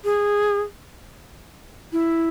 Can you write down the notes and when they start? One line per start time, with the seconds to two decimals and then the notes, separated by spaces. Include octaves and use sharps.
0.04 G#4
1.92 E4